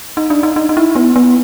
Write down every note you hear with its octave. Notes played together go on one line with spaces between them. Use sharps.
D#4
D4
D#4
D#4
D#4
E4
B3
B3